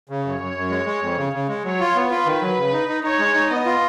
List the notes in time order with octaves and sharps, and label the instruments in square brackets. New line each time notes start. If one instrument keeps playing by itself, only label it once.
[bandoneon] C#3
[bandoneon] F#2 [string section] C#5
[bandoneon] F#2
F#2
G#3
G#3
F2
C#3
C#3
G#3
[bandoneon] F#3 [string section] C#5
[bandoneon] F4
B3
[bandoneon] F4 [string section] B4
[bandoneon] D#3
F#3
C#3
D#4
D#4
[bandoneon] D#4 [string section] C#5
[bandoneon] G#3
D#4
[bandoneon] B3 [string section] D#5
[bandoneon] F4